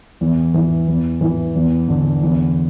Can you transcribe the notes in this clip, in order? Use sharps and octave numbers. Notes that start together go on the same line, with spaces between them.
E2
E3
E2
E3
E2
D3
E2